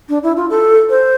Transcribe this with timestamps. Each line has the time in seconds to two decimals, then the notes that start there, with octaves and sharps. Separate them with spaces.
0.09 D4
0.23 E4
0.36 F4
0.50 A4
0.89 C5